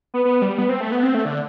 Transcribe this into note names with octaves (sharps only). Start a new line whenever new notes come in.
B3
B3
G3
B3
C4
A3
B3
C4
A3
D3